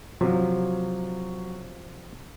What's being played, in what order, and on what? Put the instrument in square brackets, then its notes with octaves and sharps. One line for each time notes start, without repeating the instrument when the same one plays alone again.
[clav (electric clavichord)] C3 F3 [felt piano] F#3